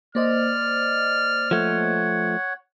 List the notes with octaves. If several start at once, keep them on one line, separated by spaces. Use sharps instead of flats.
A#3 C5 D5 D#5 F6
F3 A3 C#5 F#5